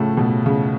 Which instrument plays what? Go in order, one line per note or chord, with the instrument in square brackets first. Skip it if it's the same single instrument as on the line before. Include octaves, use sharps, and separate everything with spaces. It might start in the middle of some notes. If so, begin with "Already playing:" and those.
Already playing: [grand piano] A2 F3 A3 [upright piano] C#3
[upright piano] B2
C#3